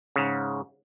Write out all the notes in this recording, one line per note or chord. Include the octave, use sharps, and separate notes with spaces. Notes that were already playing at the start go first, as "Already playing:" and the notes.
G#2 C#3